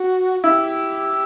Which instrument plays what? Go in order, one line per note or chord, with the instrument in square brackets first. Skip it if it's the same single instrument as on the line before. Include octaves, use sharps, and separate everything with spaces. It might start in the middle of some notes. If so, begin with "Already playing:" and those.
Already playing: [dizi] F#4
[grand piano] E4 [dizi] G4